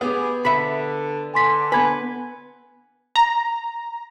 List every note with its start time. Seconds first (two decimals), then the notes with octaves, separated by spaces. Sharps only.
0.01 B3 E4 G4 G#4
0.45 D3 E5 F#5 B5
1.34 D3 G#5 C6 B6
1.72 B3 B4 G#5 B5 G#6
3.16 A#5